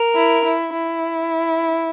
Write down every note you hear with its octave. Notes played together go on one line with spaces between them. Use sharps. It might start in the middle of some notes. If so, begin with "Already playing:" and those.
Already playing: A#4
E4
E4
E4